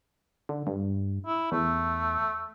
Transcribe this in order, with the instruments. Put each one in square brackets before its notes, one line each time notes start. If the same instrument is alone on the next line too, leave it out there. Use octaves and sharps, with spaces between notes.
[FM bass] D3
G2
[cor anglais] E4
[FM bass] E2 [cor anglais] A3